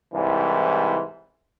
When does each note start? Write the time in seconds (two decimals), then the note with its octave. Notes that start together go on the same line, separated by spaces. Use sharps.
0.12 C2 G#2 E3